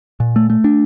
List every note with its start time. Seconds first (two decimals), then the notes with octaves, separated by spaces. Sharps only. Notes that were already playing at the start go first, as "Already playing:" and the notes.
0.20 A#2
0.36 A3
0.50 A3
0.64 D4